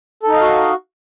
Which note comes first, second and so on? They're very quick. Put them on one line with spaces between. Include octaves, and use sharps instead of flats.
A4 D#4 D#5 F5 F#4